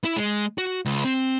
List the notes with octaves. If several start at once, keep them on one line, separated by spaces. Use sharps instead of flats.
E4
G#3
F#4
C#2
C4